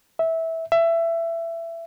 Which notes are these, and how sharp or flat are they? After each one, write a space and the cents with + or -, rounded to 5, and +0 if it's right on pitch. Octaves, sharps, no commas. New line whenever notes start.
E5 -15
E5 +20